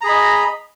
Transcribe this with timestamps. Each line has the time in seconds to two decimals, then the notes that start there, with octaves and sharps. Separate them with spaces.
0.01 A#5
0.04 G#4
0.06 B5
0.09 D#5